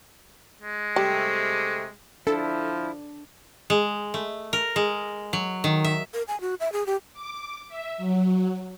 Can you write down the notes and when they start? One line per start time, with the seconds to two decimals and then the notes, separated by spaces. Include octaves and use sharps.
0.61 G#3
0.96 C3 G3 A3
2.27 F3 D4 E4 A4
3.70 G#3
4.14 A3
4.53 A#4
4.76 G#3
5.33 F#3
5.64 D#3
5.84 E5
6.14 A#4
6.28 G#5
6.41 F#4
6.60 E5
6.72 G#4
6.86 G4
7.13 D6
7.69 E5
7.98 F#3